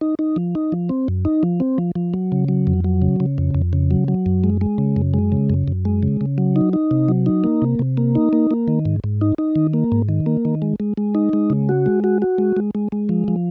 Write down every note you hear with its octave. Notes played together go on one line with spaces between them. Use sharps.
D#4
D#4
F3
D#4
F3
C4
F#2
D#4
F3
C4
F3
F3
F#3
C#3
F#3
F2
F#3
C#3
C#3
F2
F2
C#3
F#3
F#3
F#2
G#3
G#3
C#3
F#2
G#3
C#3
F#2
F#2
G#3
C#3
C#3
F#3
D#4
D#4
C3
F#3
D#4
A#3
C3
C3
A#3
D#4
A#3
A#3
D#3
G#2
G#2
D#4
D#4
D#3
A#3
G#2
D#3
A#3
D#3
G#3
G#3
G#3
D#4
G#3
C#3
F#4
G#3
F#4
F#4
G#3
G#3
G#3
G#3
F3
F3